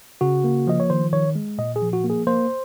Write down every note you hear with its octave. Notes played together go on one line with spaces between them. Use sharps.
C#3 F#4
A#3
F3 D#5
C#5
D#3 C5
D#3 C#5
G#3
A#2 D#5
G#4
F3
F#4
A#3
G#4
A#3 C5